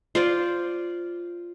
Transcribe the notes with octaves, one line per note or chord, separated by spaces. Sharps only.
F4 C5 D5